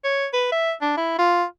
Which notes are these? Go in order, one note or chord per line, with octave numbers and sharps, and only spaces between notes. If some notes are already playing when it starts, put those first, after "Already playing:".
C#5
B4
E5
D4
E4
F4